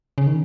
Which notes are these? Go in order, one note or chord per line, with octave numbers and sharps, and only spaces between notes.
C#3
D#3